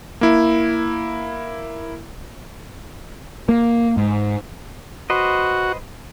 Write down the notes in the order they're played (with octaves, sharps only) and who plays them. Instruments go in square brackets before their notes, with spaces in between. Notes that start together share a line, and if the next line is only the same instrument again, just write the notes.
[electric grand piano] A#3 E4
[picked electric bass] A#3
G#2
[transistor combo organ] F#4 [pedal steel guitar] B4 C5 D#5